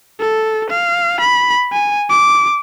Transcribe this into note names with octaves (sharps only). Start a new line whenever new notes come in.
A4
F5
B5
G#5
D6